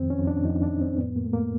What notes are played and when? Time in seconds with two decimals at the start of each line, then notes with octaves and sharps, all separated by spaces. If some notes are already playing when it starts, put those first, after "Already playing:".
Already playing: F2 D#3 C4
0.10 C#4
0.19 F2
0.27 D4
0.45 F2 D#4
0.63 D4
0.71 F2
0.81 C4
0.98 A2 B3
1.16 A#3
1.25 A2 A3
1.33 A#3